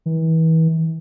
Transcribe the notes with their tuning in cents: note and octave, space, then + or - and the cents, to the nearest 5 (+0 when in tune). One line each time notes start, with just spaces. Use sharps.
E3 -35